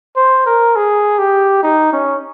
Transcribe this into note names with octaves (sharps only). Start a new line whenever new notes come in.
C5
A#4
G#4
G4
D#4
C#4